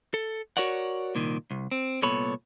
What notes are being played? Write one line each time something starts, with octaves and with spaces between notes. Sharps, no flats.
A4
F#4 A#4 C#5 D5 F#5
C2 A#2 D#3
C2
C4
C2 A#2 B3 A4 C#5 B5